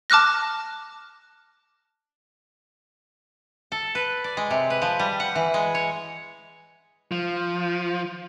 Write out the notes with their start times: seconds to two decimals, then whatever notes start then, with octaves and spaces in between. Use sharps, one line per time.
0.10 A5 D6 F6 F#6 A#6
3.72 A4
3.95 B4
4.24 D5
4.37 G#3
4.51 C3
4.70 B4
4.82 F3
4.99 G3
5.20 F#5
5.35 E3
5.54 G#3
5.75 C#5
7.11 F3